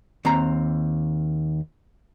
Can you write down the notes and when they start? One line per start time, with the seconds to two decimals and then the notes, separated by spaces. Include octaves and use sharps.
0.25 D#2 C4 A#5